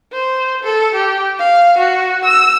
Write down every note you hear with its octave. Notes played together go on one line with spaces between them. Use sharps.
C5
A4
G4
F5
F#4
E6